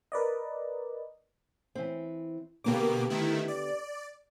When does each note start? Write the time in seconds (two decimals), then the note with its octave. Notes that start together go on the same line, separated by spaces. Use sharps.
0.12 A#4 B4 D5 D#5
1.75 E3 C4
2.64 B2 D3 A#3 B3 G4 D6
3.10 D#3 A3 E4
3.48 D5